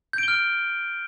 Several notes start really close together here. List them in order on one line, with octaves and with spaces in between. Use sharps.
G6 D7 G7 F6